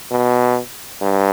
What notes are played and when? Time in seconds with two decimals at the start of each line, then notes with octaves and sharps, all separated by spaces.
0.11 B2
1.01 G2